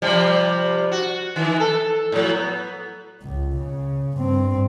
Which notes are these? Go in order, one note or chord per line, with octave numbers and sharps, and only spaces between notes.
C3 F3 G3
F#4
D#3 E3
A4
A2 F#3
B3
C#2
C#3
G2 C4